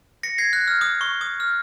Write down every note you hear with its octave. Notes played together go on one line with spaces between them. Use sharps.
A#6 C#7
G#6 C7
F#6
F6
D#6
C#6
D#6
F6